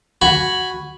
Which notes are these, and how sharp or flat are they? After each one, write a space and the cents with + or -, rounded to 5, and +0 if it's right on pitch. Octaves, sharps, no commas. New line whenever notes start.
F#4 +0 G#5 +0 B5 +0